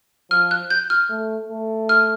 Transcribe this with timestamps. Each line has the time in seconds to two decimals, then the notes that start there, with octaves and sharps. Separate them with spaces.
0.31 F3 F6
0.51 F#6
0.70 G6
0.90 F6
1.10 A3
1.49 A3
1.89 F6